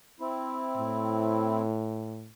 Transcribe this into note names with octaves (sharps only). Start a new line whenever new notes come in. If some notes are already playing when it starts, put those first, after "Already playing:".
C4 E4
A2